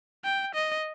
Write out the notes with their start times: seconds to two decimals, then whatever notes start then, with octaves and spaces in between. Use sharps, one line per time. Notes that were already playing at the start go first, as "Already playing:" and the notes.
0.24 G5
0.55 D#5